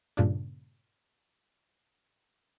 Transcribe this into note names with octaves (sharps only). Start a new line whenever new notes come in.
G2 A#2 C#3 D4